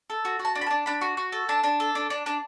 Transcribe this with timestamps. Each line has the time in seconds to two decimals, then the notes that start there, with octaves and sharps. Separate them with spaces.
0.10 A4
0.25 F#4
0.39 F#4
0.45 A5
0.55 D4
0.61 B5
0.66 A5
0.70 D4
0.86 D4 B5
1.01 F#4
1.17 F#4
1.32 A4
1.49 D4 A5
1.64 D4
1.80 A4
1.95 D4
2.10 D4
2.26 D4